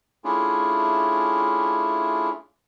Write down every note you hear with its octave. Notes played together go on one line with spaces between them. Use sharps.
A3 C#4 D4 E4 F4 G#4